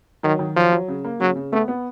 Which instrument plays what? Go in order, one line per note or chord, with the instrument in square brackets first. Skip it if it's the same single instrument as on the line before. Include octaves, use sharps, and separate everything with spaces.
[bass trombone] D#3 [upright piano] F#3
[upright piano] D#3
[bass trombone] F3 [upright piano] F#3
[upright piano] F#3
C#3
A#3
[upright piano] C#3 [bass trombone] F#3
[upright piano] C#3
[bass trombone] A3 [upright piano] B3
[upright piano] B3